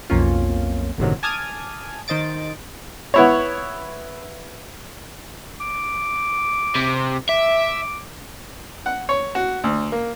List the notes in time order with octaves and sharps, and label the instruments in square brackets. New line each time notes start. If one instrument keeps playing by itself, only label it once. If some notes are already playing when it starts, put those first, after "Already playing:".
[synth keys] B1 F2 A#3 C#4 F4
G1 F#2 A2 C3 D#3 F#3
G#5 A5 D6 D#6 F6 G#6
D#3 C5 D#5 A6 D7
[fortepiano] B3 E4 C#5
[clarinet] D6
[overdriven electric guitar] C3
[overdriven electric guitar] E5 [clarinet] D6
[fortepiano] F#5
C#5
F#4
D2
A#3